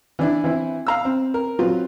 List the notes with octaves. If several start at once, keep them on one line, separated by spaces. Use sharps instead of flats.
E3 D4 E4
E3 C4 E4
F5 A#5 E6
C4
A#4
F#3 C4 F4 B4